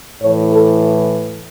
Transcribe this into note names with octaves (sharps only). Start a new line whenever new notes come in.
A2 E3 C#5
A4